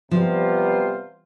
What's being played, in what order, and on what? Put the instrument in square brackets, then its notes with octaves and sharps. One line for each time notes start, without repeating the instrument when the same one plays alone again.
[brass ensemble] C3 G3 B3 F4 C5 [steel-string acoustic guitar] F3